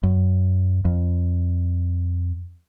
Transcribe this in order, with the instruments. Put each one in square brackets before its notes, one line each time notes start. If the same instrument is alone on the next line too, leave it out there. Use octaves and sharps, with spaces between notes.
[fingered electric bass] F#2
F2